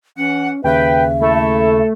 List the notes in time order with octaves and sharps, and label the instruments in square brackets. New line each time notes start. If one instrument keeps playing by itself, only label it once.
[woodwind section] E3 F#5 [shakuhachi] C#4
[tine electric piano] D#2 C#3 [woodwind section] B4 [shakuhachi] E5 [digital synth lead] G5
[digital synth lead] A3 [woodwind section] E4 A4